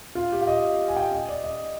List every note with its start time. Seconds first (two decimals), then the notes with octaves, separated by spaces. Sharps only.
0.15 F4
0.32 G4
0.41 F5
0.47 D#5
0.88 G#5
0.97 G5
1.12 D#5
1.29 D5
1.44 D#5